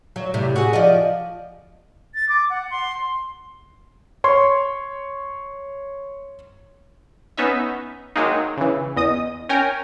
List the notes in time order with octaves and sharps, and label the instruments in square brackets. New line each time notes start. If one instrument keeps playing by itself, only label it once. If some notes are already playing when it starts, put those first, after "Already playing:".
[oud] F#3
A2 C3
F#4 G#4
F3 D5 D#5
[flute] A6
D6
F#5
C6
[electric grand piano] C#5 C6 C#6
[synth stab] B3 C#4 D#4 E5
D#3 F#3 G#3 A#3 D#4
C#3 E3
E2 D#5 D#6
C#4 A#4 G5 G#5